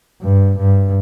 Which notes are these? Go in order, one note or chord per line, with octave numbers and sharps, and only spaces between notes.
G2
G2